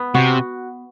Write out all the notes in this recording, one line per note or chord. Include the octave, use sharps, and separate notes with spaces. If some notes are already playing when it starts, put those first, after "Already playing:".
Already playing: B3
C3 F#4